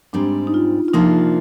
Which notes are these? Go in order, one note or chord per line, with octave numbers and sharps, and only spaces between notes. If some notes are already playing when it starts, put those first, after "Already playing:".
G#2 G3 C4 D4
D#4
F4
F4
C3 F3 A#3 D4 D#4